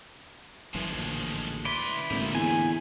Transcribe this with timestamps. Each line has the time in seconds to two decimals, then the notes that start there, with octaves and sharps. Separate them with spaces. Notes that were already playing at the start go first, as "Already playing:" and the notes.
0.75 F#1 F#2 E3 F3 G#3
0.89 A1 D2 A#2
1.65 C#2 E4 B4 D5 C6
2.11 G#1 A2 D3 A#3 D#4 F4
2.35 E2 G#5